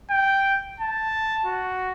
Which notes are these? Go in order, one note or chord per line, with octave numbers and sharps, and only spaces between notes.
G5
A5
F#4